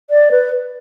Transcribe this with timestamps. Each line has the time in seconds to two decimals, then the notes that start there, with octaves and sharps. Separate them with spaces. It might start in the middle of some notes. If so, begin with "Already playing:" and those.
0.10 D5
0.31 B4